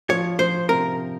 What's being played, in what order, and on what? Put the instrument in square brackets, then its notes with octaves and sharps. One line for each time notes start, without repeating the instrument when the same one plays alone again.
[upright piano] F3 [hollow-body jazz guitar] C#5
[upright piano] F3 [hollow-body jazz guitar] C5
[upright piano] C3 [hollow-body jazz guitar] A#4